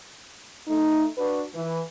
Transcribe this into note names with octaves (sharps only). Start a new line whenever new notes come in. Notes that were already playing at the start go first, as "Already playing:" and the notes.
A3 D#4
D4 F#4 B4
E3